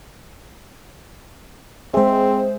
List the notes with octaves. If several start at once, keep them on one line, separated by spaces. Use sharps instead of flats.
G#3 C4 G#4 C5 E5